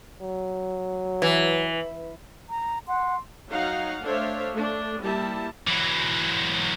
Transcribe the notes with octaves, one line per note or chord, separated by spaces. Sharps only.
F#3
E3
A#5
F#5 C6
F#3 D#4 F5 F#5
A3 D4 C5 C#5 E5 F5
A3 D4
G3 A#3 E4 A5
E3 F#3